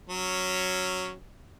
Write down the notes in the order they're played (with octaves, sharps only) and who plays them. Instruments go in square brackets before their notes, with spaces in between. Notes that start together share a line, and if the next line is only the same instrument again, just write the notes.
[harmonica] F#3 C#4